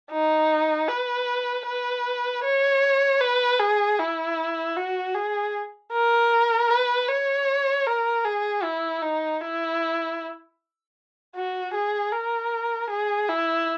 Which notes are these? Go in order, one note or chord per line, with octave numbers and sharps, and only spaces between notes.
D#4
B4
B4
C#5
B4
G#4
E4
F#4
G#4
A#4
B4
C#5
A#4
G#4
E4
D#4
E4
F#4
G#4
A#4
G#4
E4